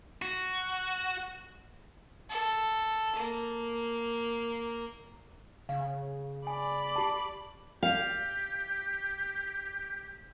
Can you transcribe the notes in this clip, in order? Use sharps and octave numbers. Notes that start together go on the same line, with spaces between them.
F#4
A4
A#3
C#3 F5
D5 G#5 B5
G4 A5
G4 F5